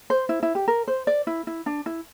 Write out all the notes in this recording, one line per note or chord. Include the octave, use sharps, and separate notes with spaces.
C5
E4
E4
G4
A#4
C5
D5
E4
E4
D4
E4